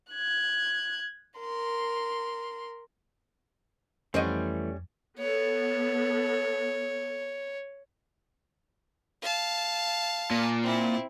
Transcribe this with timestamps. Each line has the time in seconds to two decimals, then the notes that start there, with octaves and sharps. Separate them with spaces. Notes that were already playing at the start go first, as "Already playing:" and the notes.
0.12 F#6 G#6
1.40 A#4 C6
4.14 F2 E3 G3 A3 C#4 C5 D#5 F#5
5.19 B3 A4 C#5
9.22 F5 A5
10.31 A#2
10.63 C4 E4